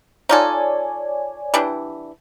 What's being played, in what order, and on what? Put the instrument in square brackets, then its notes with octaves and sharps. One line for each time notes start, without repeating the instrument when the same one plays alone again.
[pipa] D#4 F4 A4 [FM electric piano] C#5 D5 G#5
[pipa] E3 G3 D4